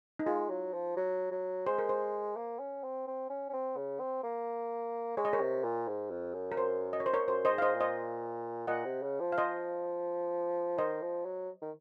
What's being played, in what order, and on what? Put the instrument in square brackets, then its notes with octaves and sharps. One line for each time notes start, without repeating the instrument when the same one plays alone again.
[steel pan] D#4
[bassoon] G#3 [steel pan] F4
[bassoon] F#3
F3
F#3
F#3
[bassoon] G#3 [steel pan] C5
[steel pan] A#4
C5
[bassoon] A#3
C#4
C4
C4
C#4
C#4
C4
C#3
C4
A#3
[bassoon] G#3 [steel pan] C#5
[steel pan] D#5
A#4 C#5
[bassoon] C3
A#2
G#2
F2
F#2
[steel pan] A#4
C5
D#5
C#5
C5
A#4 C#5
[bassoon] F#2 [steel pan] C5
[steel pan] C5 D#5
[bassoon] G#2
[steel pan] F5
C5 D#5
[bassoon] A#2
[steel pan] C5 D#5
[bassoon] A#2 [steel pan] D#5 F#5
[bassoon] C3
C#3
F3
[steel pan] F5
C5 D#5
[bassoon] D#3 [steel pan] C5 D#5
[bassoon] F3
F#3
D#3